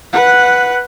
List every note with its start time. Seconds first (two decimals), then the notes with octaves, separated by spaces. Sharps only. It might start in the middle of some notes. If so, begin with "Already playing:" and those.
0.13 B4 F#5